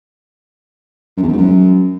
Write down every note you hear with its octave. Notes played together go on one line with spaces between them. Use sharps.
F#2
E2
F#2
G#2
F#2